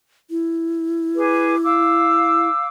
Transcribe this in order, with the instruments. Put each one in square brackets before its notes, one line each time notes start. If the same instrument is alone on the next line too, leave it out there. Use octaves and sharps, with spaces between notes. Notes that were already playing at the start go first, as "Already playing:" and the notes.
[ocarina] E4
[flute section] G#4 B4 D6
F5 D6 E6